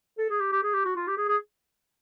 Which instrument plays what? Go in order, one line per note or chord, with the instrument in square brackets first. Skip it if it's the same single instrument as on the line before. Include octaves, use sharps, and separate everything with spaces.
[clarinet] A4
G#4
G4
G4
G#4
G4
F#4
F4
G4
G#4
G#4